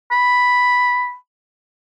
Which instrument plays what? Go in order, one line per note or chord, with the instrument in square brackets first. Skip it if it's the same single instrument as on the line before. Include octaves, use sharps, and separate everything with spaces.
[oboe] B5